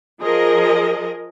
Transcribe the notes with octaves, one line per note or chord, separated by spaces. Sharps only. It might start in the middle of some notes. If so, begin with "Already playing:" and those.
F3 G#4 A#4 D#5